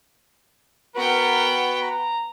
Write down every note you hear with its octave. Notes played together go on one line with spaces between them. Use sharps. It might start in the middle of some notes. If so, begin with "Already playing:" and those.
B3 F#4 A#4 B4 G5 B5
A#5